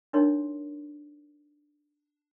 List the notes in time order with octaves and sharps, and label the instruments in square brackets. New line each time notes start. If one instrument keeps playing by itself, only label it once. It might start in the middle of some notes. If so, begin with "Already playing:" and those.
[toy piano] D4 D#4 A#4 C#5 C6